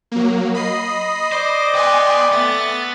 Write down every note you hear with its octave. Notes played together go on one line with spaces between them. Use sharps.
F#3 A#3
D#5 B5 D#6 C7
C5 D5 D6
B3 B4 G5 G#5 C6
A3 B3 A6